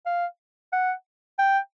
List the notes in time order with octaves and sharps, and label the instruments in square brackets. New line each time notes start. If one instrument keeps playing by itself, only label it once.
[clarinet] F5
F#5
G5